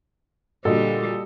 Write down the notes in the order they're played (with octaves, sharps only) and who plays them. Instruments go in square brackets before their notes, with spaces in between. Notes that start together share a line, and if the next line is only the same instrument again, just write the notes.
[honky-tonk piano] A#2 D3 F#4 [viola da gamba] G3 [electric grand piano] A4 D#5